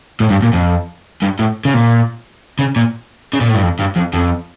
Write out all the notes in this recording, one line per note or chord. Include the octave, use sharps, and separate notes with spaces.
A2
G2
A#2
F2
G2
A2
C#3
A#2
C#3
A#2
C#3
A#2
A2
G2
F2
G2
F2
F2